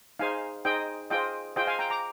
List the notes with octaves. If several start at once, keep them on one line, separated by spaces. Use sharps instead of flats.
D#4 G#4 C5 F5 G#5
D#4 G#4 C5 D#5 G5
F4 G#4 C5 D#5 G5
F4 G#4 C5 D#5 G5
F5 G#5
G5 A#5
A#5 D6